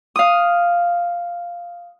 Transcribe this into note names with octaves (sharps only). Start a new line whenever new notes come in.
F5 D#6